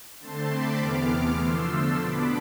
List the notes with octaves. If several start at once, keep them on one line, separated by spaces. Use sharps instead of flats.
D3 A3 C4 A5 C6
B5 D6
E2 C3 E3 B3 D6 F6
D3 F3 A3 C6 E6
A5 C6
B2 B3 D4 B5 D6